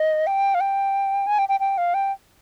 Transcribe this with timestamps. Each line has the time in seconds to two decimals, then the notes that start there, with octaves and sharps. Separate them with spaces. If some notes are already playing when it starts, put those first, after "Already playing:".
Already playing: D#5
0.27 G5
0.54 F5
0.60 G5
1.27 G#5
1.39 G5
1.49 G5
1.60 G5
1.78 F5
1.94 G5